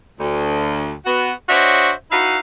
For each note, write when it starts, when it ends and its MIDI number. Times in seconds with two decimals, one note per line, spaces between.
0.20 0.93 38
1.06 1.32 59
1.06 1.32 66
1.49 1.91 62
1.49 1.91 66
1.49 1.91 72
1.49 1.91 73
1.49 1.91 75
1.49 1.91 76
2.11 2.37 63
2.11 2.37 64
2.11 2.37 66
2.11 2.37 71
2.11 2.37 76
2.11 2.37 77